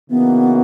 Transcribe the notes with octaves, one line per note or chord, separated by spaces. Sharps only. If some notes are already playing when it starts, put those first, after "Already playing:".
C#3 E3 A#3 B3 D#4 F#4